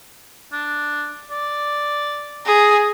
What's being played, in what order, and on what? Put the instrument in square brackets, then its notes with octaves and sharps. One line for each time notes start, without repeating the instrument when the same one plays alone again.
[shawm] D4
D5
[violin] G#4 [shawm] A#5